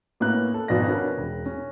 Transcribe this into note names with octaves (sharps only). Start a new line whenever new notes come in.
A2 A#3 B3 C#4 A#5 F#6
A4
G#1 F2 B2 F#4 D5 A#6
C#4 D4 F#4 A#4 B4
E1
C#4